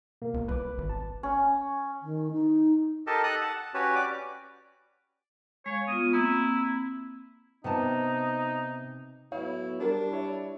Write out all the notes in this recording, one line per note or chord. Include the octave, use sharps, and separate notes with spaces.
B2 A#3 A#4
C#2
C2 B4 D6
G#1
A5
C#4
D#3
D#4
G4 A4 A#4 D#5 A5
A4 D#5 D#6 F#6
F#5 A5
A5
C#4 F#4 G4 B4 C#5
D5 D6
G#3 C#5 F5
B3 F4 D#6
A#3 C4 E4
C3 B3 D#4 A5
A2 F#3 B3 E4 C#5 F5
G3 D4 G4 A#4
E4 C#5 E5